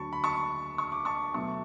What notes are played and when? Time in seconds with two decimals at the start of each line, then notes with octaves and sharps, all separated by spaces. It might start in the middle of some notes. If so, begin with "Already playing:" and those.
Already playing: D2 D3 F#3 A5 B5 C#6
0.13 B5
0.24 A5 C#6
0.78 C#6
0.92 D6
1.05 A5 C#6
1.34 B2 F#3 A3 A5 C#6